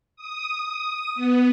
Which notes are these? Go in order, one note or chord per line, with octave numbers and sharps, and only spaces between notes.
D#6
B3